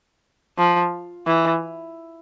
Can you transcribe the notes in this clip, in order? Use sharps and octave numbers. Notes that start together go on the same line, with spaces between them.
F3
E3